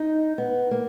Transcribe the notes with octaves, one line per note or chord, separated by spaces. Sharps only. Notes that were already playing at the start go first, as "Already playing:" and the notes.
Already playing: D#4
B3
A#3